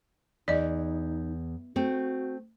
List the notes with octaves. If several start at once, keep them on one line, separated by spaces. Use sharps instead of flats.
E2 D#4 D5 D#5
A3 C4 F#4